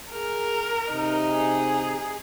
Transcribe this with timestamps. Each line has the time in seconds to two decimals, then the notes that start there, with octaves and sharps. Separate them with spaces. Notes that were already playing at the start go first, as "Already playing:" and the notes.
0.12 G#4 A#4
0.91 C3 D#4
1.32 G#4